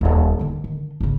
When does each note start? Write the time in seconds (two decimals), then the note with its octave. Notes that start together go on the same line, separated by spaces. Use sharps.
0.01 D#1 C4
0.39 D3 D#3
0.64 D#3
1.00 G#1 C#3